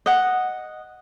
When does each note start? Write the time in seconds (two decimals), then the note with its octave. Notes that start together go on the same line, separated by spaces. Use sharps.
0.06 D#5 F#5